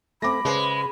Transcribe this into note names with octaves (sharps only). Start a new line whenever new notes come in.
A3 C4 B5 D6 A#6
C#3 G#3 B4 C5